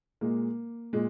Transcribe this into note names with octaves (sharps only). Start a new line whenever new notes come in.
A#2 G#3 A#3
A#2 G#3